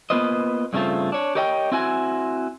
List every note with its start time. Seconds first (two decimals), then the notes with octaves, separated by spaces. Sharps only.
0.10 A#3 B3 F4 B4 C5 D#5
0.73 G2 C#3 G3 A3 C4 F4
1.12 D4 C#5
1.35 G4 A#4 C#5 D#5 F5 G5
1.72 C4 E4 F#4 G#5